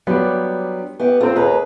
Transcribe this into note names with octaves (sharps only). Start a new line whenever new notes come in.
F#3 G3 B3 D4 F4
B3 G4 E5
A3 C4 F4
D#2 G#4 B4 A#5